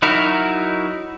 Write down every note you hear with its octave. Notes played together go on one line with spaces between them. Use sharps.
F#3 D#4 E4 F#4 A#4